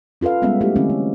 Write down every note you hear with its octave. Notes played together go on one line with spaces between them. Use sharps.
C#4 F4 A4 B4 F5
G3 G#3 B3 C#4 F4 E5
G#3 A3 B3 E4 F#4 G4
D3 E3 A3 C4 C#4
A3